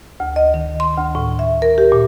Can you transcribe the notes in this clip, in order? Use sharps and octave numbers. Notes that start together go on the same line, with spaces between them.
D2
D#5
D#3
C6
D2
A2
E5
A#4
G4
A#2